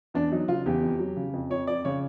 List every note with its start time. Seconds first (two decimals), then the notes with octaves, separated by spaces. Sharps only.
0.14 E2 D4
0.32 F#3 D#4
0.48 C#3 F4
0.66 E2 G4
0.82 F2
0.99 F#3
1.17 C#3
1.33 F2
1.50 F2 C#5
1.67 F3 D5
1.85 C#3 C#5